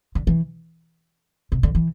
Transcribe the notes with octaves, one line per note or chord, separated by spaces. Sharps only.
D3
E3
C3
D3
E3